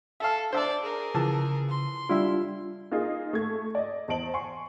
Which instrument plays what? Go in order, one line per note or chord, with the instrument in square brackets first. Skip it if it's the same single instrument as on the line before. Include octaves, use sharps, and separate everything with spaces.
[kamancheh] A4 [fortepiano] E5 F5
[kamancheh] D4 D5 [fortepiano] C5 E5 A5
[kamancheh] G#4 A#4
[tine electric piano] C#3 [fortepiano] E3 F3 A5
[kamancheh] C6
[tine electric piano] G3 D4 F4 [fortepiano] E4 E5
[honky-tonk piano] A#3 D#4 F4 G#4
A3 G#6
D5 D#5
E2 C5 D#5 A5 D7 F#7
G#5 C6 C#6